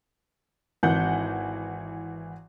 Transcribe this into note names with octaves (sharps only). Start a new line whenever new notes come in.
G#1 E3 F#5 G6